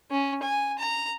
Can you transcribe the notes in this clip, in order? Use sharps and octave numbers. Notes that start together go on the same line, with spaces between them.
C#4
G#5
A#5